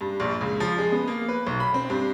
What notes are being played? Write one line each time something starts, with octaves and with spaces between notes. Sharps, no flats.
G2
A#1
C#2
F3
G#3
B3
A#3
B4
B1
B5
C4
G2